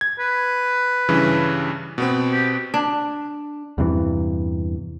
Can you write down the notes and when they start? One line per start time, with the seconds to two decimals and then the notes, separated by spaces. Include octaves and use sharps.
0.01 G#6
0.19 B4
1.09 G2 C#3 E3
1.98 B2 B3 C4
2.32 G4
2.74 D4
3.78 E2 G2 C3 E3